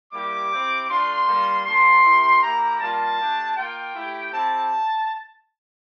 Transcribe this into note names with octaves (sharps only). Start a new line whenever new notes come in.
G3 A#3 E4 G4 D6
C4 E4 G4
A3 D4 F4 C6
G3 A#3 F4
A#3 D4 F4 C6
A#3 E4 G4
A#3 E4 G4 A#5
G3 A#3 F4 A5
A3 D4 G4
A#3 F4 G5
A3 E4 G4
C4 E4 G4 A5